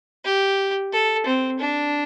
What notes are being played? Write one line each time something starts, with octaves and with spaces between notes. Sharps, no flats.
G4
A4
C4
D4